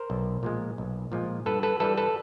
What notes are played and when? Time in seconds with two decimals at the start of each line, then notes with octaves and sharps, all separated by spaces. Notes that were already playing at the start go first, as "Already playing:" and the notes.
Already playing: A#4 C5
0.10 B1
0.43 A#2 F3 G#3
0.78 B1
1.12 A#2 F3 G#3
1.46 G2 A4 B4
1.63 A4 B4
1.80 E3 G3 A4 B4
1.97 A4 B4